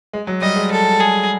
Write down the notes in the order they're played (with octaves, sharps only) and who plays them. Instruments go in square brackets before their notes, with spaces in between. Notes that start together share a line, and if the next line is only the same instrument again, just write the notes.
[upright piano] G#3
F#3
[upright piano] G3 [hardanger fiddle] D#5
[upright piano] G#3
[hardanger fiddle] A4
G#4